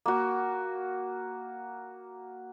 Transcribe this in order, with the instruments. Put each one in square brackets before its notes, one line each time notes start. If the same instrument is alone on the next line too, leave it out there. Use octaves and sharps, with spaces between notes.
[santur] A#3 F#4